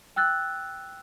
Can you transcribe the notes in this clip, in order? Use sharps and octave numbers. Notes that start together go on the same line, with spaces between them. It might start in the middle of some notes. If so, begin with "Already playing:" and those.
G5 E6 F#6 A6